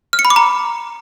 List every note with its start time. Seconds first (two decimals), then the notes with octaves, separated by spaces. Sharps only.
0.13 F6
0.19 C#7
0.25 B5
0.30 D6
0.36 A#5